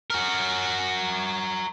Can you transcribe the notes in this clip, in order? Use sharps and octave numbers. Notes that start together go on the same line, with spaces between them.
F#4 A#4